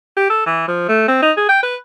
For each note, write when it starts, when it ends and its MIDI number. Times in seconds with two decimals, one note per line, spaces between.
0.17 0.28 67
0.30 0.46 69
0.47 0.66 52
0.68 0.86 53
0.89 1.06 57
1.08 1.19 60
1.23 1.32 63
1.37 1.48 68
1.49 1.62 79
1.63 1.76 71